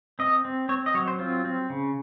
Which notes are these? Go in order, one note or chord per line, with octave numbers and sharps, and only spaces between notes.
C4 D#5
C4
C4 C#5
D#5
F#3 C#5
C5
C4 F4
C4
C#3